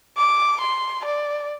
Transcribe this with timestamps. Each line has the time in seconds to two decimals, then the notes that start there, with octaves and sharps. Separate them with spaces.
0.17 D6
0.61 C6
1.05 D5